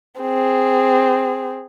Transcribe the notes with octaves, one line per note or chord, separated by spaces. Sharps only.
C4 G#4